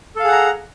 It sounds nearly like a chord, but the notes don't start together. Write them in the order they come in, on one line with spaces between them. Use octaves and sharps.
A4 F5 G#4 F#5 A#5